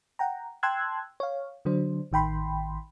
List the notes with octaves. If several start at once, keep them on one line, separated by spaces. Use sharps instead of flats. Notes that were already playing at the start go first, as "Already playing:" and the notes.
F#5 G5 A#5
G5 A5 C6 E6 F#6 G#6
C#5 F5
D3 F#3 D4 C5
A1 D#3 G5 B5 C6